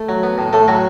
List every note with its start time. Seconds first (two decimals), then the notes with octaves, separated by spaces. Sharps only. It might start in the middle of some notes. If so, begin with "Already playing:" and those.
Already playing: A3 A4
0.09 F#3
0.23 B3
0.38 A2
0.53 A2 A3 A4
0.68 A2 F#3 F#4